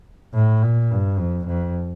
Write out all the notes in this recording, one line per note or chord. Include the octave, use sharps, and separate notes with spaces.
A2
A#2
G2
F2
F2